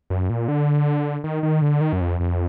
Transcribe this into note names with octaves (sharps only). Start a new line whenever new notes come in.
F#2
A#2
D3
D#3
D#3
D3
D#3
F#2
F2
F2